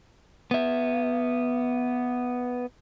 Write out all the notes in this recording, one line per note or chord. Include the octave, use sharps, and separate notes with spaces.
B3 E5